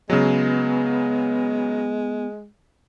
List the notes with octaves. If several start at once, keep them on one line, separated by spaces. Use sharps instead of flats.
C#3 F#3 G#3 B3